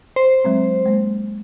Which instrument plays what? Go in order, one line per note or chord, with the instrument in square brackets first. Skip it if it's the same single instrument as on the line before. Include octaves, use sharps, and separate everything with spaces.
[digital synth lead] C5
[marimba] F#3 G#3 C4
G#3 A#3